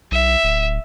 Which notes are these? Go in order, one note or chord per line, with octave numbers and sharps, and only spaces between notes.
B1 E5
D1